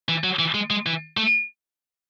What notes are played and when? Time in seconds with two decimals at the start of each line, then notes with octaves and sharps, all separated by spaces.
0.09 E3
0.24 F#3
0.39 E3
0.54 G#3
0.70 G#3
0.86 E3
1.17 A3